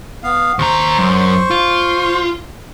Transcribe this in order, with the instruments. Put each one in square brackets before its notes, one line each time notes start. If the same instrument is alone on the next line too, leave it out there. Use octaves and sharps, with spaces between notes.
[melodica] B3 F5
[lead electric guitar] D#2 A#5 [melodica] C5 C#6
[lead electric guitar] F#2
F4